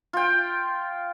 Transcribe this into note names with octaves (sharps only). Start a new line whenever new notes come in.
F4 G5